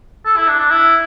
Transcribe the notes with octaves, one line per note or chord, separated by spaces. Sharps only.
A4
E4
D4
D4
E4